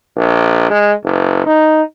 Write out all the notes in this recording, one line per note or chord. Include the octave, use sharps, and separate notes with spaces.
A#1
G#3
F#1
D#4